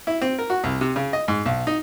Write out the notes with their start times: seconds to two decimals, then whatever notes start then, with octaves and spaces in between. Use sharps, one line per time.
0.07 E4
0.22 C4
0.39 A#4
0.50 F#4
0.64 C2
0.81 C3
0.96 C#3
1.13 D#5
1.28 G#2
1.46 B1
1.67 D#4